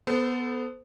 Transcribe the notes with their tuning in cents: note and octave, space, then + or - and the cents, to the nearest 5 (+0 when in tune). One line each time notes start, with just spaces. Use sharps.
B3 +0 A4 +0 C5 -30